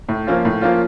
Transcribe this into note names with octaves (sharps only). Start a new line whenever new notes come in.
A2
F3 A#3 C#4 F4
A2
F3 A#3 C#4 F4